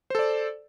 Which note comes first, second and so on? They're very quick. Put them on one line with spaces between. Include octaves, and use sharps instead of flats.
C5 A4 D5